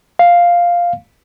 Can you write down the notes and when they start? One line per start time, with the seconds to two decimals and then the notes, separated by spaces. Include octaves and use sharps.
0.19 F5